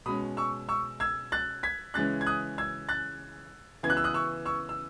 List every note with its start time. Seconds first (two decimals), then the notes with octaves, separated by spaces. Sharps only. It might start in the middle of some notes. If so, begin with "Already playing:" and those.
0.06 B2 G#3 C#4 B5 D#6
0.37 C#6 E6
0.69 C#6 E6
1.00 E6 G#6
1.32 F#6 A6
1.63 G#6 B6
1.94 C#3 E3 G#3 C#4 F#6 A6
2.21 G#6
2.26 D#6 F#6
2.58 E6 G#6
2.89 F#6 A6
3.83 C#3 E3 B3 G#6
3.90 F#6
3.97 E6
4.04 D#6 F#6
4.14 C#6 E6
4.46 C#6 E6
4.69 E6